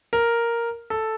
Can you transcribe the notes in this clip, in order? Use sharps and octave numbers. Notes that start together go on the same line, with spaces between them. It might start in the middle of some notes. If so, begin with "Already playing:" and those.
A#4
A4